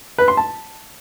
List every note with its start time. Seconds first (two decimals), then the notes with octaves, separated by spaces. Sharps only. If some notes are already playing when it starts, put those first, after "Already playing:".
0.18 B4
0.28 C6
0.37 A5